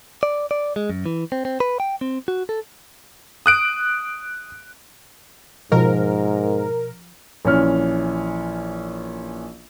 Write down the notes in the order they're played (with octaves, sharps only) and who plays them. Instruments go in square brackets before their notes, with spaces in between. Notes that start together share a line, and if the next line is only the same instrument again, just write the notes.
[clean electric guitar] D5
D5
G#3
F#2
E3
C4
C4
B4
G5
C4
F#4
A4
[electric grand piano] D#6 F#6 D7
[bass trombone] G#2 [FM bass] B2 [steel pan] F3 [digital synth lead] A#4
[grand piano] A#1 E3 C#4 F6